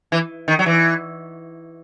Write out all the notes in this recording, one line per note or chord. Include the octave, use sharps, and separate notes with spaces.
E3
D#3
F#3
E3